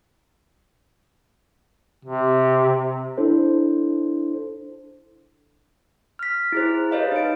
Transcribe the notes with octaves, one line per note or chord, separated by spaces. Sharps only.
C3
D4 E4 A4 C5
F6 B6
E4 G#4 C5
G4 B4 C#5 D#5 F5
D#4 D7